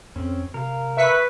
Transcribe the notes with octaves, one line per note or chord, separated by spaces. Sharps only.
F2 C4 C#4
C3 A#4 F5
B4 E5 C#6 B6